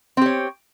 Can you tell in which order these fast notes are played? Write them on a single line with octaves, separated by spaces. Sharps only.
C4 G4 C#5